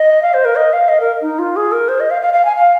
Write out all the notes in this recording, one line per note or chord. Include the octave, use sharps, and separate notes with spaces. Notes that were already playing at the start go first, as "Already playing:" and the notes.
Already playing: D#5
F5
C5
A#4
D#5
F5
D#5
A#4
D#4
F4
G#4
A#4
C5
D#5
F5
F5
F5
G#5
F5